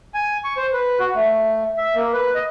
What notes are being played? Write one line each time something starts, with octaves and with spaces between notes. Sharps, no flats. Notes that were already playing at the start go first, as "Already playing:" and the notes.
G#5
C#6
C5
B4
F#4
A3
E5
A#3
B4
D#5